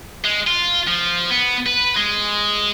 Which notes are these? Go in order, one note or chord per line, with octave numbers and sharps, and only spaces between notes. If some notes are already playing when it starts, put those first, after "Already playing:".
G#3
F4
F3
B3
B4
G#3